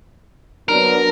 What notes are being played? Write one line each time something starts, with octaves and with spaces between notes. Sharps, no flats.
F#3 B3 D4 A#4